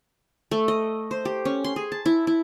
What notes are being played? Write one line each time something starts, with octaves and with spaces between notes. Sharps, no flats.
A3
D#5
C5
G4
C#4
C6
G#4
A5
E4
E4